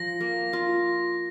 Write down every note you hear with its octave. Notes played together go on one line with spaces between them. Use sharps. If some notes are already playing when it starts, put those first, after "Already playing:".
Already playing: F3 A#6
A#3
F4